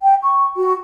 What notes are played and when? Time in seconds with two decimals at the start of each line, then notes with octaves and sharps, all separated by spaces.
0.02 G5
0.23 C#6
0.57 F#4